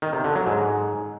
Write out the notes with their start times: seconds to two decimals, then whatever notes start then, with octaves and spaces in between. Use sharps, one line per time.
0.02 D#3
0.13 C3
0.24 D3
0.35 F#3
0.46 G#2